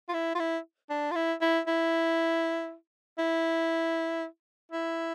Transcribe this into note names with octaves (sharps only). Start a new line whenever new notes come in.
F4
E4
F4
E4
D4
F4
E4
E4
E4
E4
E4